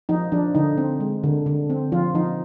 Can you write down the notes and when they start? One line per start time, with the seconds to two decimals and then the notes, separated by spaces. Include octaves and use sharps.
0.09 F3 D#4
0.32 F3 D4
0.55 D3 D#4
0.78 C4
1.00 G#3
1.24 D3
1.46 D3
1.70 C4
1.92 F3 F4
2.15 F3 D#4